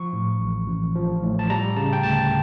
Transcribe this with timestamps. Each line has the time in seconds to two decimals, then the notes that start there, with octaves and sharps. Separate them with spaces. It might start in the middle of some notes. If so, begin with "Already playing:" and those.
Already playing: F3 C#6
0.13 A2
0.40 A1
0.68 A1
0.95 F3
1.23 A2
1.39 A5
1.50 G3 A#5
1.76 C#3 A5
1.93 G5
2.03 D2 A5